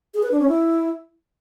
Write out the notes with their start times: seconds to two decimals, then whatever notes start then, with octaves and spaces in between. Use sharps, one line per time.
0.14 G#4
0.23 B4
0.31 D4
0.40 C#4
0.48 E4